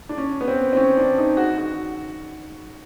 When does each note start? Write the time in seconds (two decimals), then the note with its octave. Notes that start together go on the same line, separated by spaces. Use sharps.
0.09 D4
0.18 C#4
0.41 B3
0.48 C4
0.73 C4
0.77 C#4
0.97 D4
1.18 D#4
1.37 F#4
1.58 F#4